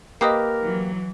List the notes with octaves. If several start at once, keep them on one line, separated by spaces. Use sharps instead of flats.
A#3 G4 A#4 B4 D#5 D#6 C7
E3 F#3